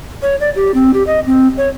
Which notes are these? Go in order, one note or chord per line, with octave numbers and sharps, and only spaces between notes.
C#5
D5
G4
C4
G4
D#5
C4
C#5